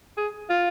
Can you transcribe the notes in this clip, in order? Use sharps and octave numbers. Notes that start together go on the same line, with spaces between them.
G#4
F4